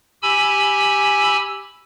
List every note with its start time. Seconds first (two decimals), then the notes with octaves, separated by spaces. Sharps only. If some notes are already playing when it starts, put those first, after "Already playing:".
0.23 G4 G#5 B5 E6